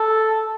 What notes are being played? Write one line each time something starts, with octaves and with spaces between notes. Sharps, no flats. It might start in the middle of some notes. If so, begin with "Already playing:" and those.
Already playing: A4